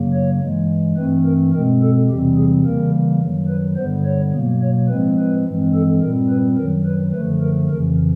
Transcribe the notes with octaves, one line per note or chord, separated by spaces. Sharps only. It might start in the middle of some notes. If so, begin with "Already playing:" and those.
Already playing: F#2 C#3 F#3 A#3
C#5
G2 E3 G#3
G2 E3 A3 C4 B4
A#4
B2 G#3 C4 A#4
A4
E2 C3 E3 G3 C4 G4
G#4
C#3 E3 G3 A#3 A#4
F#2 D#3 F#3
B4
G2 D3 G3 B3 C5
C#5
B2 F#3 A#3
C#5
A2 F3 G#3 C4 B4
B4
G2 E3 G#3 C4
A4
A#2 G3 C4 A#4
B4
F#2 D#3 F#3 A#4
B4
F#2 D3 F3 A3 B4
A#4
F2 C#3 E3 A#4